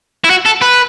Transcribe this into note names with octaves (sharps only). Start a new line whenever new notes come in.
E4
F#4
A4
B4